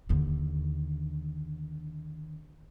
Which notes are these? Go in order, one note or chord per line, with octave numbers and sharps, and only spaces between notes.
D#2 D3